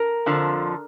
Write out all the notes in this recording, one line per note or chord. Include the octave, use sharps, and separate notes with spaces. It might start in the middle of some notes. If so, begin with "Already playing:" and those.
Already playing: A#4
F2 D3 F3